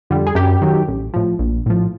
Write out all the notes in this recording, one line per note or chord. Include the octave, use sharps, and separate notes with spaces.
F2 D3 G3
G#4
F#2 G4
D#3 F#3
A1
A2 F3
A#1
A2 F3